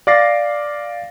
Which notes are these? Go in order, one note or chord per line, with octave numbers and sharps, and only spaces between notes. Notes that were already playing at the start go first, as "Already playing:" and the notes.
D5 F5 D6 A6 A#6 C7